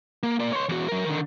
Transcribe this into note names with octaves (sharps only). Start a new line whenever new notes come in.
A#3
A#3 D5
C#5 C6
E2 F#4
F#3 A#4
D3 D#3